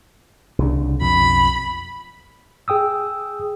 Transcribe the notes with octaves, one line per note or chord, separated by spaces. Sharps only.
C2 C#3 D4
B1 F2 B5
G#4 G5 D#6 E6